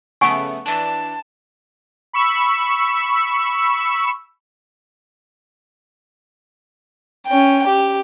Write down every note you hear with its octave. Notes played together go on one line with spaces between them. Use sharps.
C#3 A3 B3 F#5 G#5 C#6
E3 D4 A5
B5 C#6 E6
C#4 G5
G4